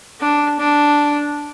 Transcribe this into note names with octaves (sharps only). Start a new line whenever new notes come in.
D4
D4